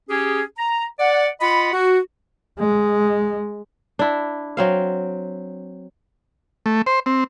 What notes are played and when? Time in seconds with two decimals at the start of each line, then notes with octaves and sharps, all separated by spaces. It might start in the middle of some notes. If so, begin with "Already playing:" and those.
0.09 C#4 G4 G#4
0.57 A#5
0.99 D5 F#5
1.41 F4 D#5 F#5 B5
1.73 F#4
2.59 G#3
3.99 D4 E4
4.57 F#3 C4 F5
6.66 A3
6.86 C5
7.06 C4